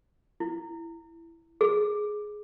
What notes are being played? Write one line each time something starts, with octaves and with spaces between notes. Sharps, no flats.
E4
G#4